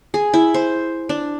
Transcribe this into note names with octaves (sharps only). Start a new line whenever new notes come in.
G#4
E4
C5
D4